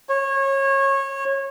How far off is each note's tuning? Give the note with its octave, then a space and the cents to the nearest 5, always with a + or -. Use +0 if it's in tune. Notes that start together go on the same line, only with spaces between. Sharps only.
C#5 -25